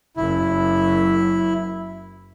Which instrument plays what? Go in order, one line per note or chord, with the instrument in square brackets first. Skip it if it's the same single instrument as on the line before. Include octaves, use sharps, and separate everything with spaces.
[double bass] F#1 F#2 [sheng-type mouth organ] E4